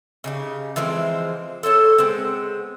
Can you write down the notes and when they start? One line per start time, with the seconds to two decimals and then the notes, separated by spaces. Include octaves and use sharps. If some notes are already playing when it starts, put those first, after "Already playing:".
0.24 C#3 D#4 G4
0.76 E3 F3 G#3 C4
1.63 A4 C5 C#5 A5
1.98 G#3 B3 C4